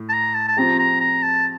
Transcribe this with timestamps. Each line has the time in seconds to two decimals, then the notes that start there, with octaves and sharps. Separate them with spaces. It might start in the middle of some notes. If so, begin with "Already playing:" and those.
Already playing: A2
0.09 A5
0.13 A#5
0.34 A5
0.48 A5
0.57 F3 C4 G4 A#5
0.79 A#5
1.00 A#5
1.22 A5